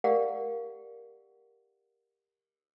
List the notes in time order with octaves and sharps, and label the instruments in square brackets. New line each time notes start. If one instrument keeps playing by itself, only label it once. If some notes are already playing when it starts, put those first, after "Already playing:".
[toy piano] G4 A#4 D5 F5 F#5 A#5